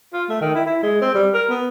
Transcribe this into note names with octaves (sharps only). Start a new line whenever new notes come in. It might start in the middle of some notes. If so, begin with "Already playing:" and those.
F4
A3
D#3
E4
E4
G#3
C4
G3
A#4
B3